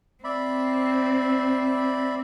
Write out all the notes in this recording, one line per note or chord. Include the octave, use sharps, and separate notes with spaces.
C4 D5 E5 B5